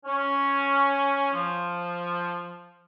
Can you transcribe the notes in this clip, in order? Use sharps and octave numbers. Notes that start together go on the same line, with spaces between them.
C#4
F3